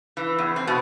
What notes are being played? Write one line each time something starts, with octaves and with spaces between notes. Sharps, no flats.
E3
E2
C4
B2